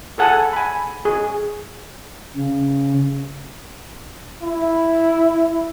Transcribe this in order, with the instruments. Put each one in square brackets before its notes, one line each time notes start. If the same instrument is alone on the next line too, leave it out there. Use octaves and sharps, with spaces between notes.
[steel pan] G#4 A4 F#5 G#5 A5
G#5 B5
G#4
[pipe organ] C#3
[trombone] E4